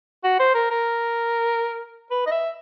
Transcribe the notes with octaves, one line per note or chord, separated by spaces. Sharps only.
F#4
C5
A#4
A#4
B4
D#5
E5